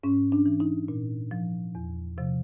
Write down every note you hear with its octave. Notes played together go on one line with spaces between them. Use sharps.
G#2 C#4
D4
E3
D#4
A#2
F3
E2
C3 F3